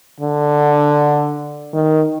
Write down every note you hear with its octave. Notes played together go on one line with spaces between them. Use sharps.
D3
D#3